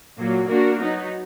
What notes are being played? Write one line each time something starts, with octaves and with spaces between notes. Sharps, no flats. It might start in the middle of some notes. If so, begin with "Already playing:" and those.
A#2 F#3 A#3
A#3 D4 F#4 A#4
F#3 B3 D#4